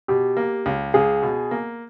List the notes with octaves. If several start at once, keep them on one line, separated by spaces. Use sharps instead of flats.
B2 G4
A#3
C#2
C#2 G#4
B2
A#3